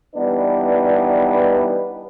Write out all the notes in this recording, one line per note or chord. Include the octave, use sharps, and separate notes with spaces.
E3 G3 B3 D4 D#4 B4